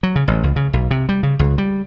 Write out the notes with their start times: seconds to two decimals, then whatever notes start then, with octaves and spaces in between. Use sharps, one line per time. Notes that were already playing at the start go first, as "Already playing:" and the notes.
0.03 F#3
0.16 C#3
0.28 A1
0.43 C#2
0.56 C#3
0.73 B1
0.91 C3
1.09 G3
1.23 C#3
1.39 C#2
1.58 G3